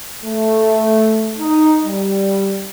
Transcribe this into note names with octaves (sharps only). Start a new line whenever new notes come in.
A3
D#4
G3